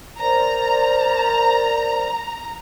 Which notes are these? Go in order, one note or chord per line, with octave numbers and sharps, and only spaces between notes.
A#4 C5 D5 A#5